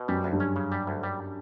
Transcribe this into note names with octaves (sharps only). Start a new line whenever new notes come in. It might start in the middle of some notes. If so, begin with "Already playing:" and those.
Already playing: B2
F#2 G3
D2
G2
C#4
C#3
G3
D2
G3